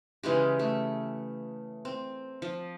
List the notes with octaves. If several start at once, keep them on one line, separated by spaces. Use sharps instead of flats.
C#3 E3 G#3 G4
A3
C4
F3